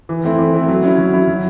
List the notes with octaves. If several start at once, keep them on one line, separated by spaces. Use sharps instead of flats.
E3
A3 C4 E4
E3
A3 C4 E4
F#3
C#4 E4
F#3
C#4 E4
F#3